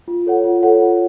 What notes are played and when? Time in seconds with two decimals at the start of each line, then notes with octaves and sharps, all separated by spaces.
0.08 F4
0.26 A4 C#5 F#5
0.44 F4
0.63 A4 C#5 F#5
0.82 F4